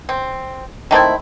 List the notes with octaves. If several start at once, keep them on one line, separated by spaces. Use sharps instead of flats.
C4
D#3 A3 C4 E4